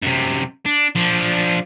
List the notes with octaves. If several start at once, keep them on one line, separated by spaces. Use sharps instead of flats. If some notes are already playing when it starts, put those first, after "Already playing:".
F#2 C3
D4
F3 D4